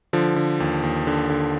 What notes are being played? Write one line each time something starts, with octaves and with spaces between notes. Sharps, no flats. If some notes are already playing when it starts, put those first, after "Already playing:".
D3 F3
D3
D#2
D#2
D3
D3